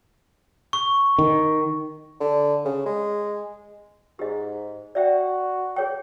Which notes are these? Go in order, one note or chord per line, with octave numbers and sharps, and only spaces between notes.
C#6
D#3
D3
C#3
G#3
G#2 G4 D#5
F#4 D5 E5 G5
G#4 C#5 G5